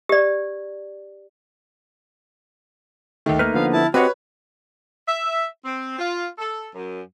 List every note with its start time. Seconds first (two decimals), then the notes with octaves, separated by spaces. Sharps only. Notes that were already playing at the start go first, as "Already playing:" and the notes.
0.09 G4 D5
3.26 D#2 D#3 A3
3.39 A#3 D#4 B4 F6
3.54 D3 F3 B3 F5
3.73 E4 A5
3.94 C4 F#4 G4 B4 C#5 D#5 F#5
5.07 E5
5.64 C4
5.98 F4
6.38 A4
6.74 F#2